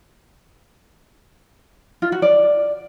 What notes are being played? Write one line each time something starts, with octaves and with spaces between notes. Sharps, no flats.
F4
F#4
D5